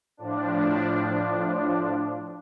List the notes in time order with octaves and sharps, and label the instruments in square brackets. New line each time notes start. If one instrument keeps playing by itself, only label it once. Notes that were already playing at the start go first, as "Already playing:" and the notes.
[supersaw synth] A2 F3 D4